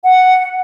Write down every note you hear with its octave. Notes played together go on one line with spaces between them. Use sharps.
F#5